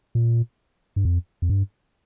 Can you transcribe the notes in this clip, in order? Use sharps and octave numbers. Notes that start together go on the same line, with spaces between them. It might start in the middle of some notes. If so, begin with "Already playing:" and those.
A#2
G2
F2
F2
G2